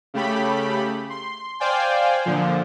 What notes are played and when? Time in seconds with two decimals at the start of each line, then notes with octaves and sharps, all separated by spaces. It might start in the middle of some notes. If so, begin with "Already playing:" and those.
0.14 C#3 A3 G4 B5
1.10 C6
1.60 C5 D5 F5 G5 G#5
2.26 A#2 D3 F3